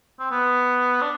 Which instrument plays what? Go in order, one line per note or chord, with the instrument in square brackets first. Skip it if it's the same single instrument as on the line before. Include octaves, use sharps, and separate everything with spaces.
[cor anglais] C4
B3
D4